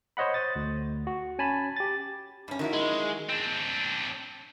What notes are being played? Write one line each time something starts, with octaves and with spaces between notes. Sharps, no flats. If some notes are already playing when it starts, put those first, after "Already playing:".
C5 C#5 D#5 F#5 B5
C5 D#6 A6
D2
F#4
C#4 G#5 A5 B5
G4 A6
G2 C#4
D#3 F#3 E4
G#3
C4 D4